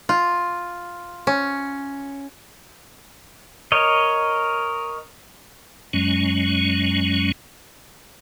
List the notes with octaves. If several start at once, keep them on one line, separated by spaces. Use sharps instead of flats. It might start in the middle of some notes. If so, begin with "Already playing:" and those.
F4
C#4
A#4 C#5 D#5
F#2 F#3 G#3 C#4